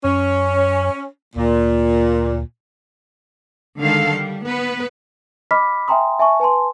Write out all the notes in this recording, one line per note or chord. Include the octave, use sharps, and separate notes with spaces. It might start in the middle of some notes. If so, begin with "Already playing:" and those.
F#2 C#4
D2 A#2
D3 D#3 G#3 A4 F5
G3
B3 B4
D#5 B5 D6 F6 B6
E5 G5 G#5 A#5 C6 D#6
E5 G#5 A5 C#6
B4 G#5 A5 C6